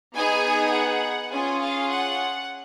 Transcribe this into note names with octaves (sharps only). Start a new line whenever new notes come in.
B3 D#4 G#4 G#5
F#5
C#4 F4 G#4 G#5
F5
F#5